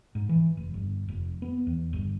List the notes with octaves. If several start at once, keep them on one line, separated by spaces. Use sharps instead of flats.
G#2
E3
F1
G1
F1
B3
E2
G1